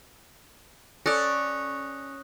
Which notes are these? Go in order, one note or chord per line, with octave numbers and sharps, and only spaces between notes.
C#4 A4 D5 D#6 F#6 A#6